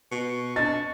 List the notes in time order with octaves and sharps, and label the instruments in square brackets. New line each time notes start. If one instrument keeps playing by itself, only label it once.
[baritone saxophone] B2 [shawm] C#6
[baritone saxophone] D4 [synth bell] D#5 [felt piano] A6